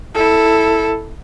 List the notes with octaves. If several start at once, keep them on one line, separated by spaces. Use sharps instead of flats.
E4 A4